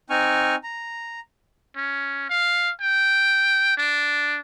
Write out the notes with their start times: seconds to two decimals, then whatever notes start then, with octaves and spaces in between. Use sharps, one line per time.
0.10 C4 D#4 G#5 C#6 F6
0.63 A#5
1.76 C#4
2.30 F5
2.81 G5
3.77 D4